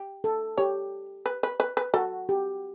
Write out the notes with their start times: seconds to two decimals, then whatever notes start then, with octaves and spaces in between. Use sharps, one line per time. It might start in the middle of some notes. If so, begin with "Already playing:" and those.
Already playing: G4
0.24 A4
0.57 G4 C#5
1.26 B4
1.43 B4
1.60 B4
1.77 B4
1.94 F#4 A4
2.29 G4